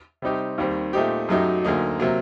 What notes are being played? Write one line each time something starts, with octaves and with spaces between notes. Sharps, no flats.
C3 G3 C4 D#4 G4
D#2 D#3 G3 C4
A#2 A3 C4 D#4 G4
F#2 F#3 A3 D#4 G4
D2 D3 F#3 A#3 D#4
C3 F#3 A#3